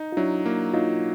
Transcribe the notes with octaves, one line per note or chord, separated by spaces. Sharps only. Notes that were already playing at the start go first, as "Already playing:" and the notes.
Already playing: D#4
F4
F#3 D4 E4
A#3
F#3 D#4 F4